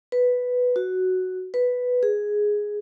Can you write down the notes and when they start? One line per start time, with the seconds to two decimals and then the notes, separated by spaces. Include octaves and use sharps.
0.12 B4
0.76 F#4
1.54 B4
2.03 G#4